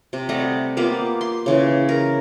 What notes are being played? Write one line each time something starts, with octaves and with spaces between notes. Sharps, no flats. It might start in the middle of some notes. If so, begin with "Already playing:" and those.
C3
G3 A3 D#5 F#5
A#3 B3 F4 G4
C6
C#3 E3
A#4